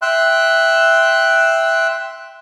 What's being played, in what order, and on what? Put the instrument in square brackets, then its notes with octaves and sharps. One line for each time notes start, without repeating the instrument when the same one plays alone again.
[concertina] E5 G5 C6 F#6